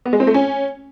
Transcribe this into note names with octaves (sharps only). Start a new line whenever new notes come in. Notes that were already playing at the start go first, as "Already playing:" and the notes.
B3
G#3
C4
A3
C#4